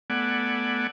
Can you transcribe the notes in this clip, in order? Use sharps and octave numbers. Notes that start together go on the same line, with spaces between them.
A3 B3 D5 F#5 G#5